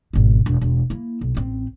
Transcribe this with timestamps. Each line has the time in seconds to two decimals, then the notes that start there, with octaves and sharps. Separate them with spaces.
0.13 G#1 B2
0.46 E1
0.61 E1
0.90 A#3 E4
1.21 B1
1.35 A1 C4